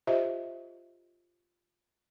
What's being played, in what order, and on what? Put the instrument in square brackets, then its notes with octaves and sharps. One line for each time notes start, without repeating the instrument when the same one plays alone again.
[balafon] F4 G4 C5 D#5 E5